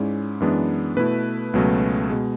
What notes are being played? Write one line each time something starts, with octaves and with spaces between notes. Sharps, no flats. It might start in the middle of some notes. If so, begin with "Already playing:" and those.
Already playing: G#2 G#3 C#4 E4 D5
F#2 E3 G#3 B3 D4
B2 A3 E4 B4
C#2 B2 F#3 A3 C#4
B2 G#3